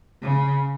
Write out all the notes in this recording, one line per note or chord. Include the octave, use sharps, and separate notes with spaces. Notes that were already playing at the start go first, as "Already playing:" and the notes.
C#3